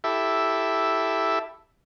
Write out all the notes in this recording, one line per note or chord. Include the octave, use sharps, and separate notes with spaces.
E4 G4 A4 E5